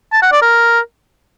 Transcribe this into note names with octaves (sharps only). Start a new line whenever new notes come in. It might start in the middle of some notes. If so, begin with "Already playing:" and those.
A5
F#5
D5
A#4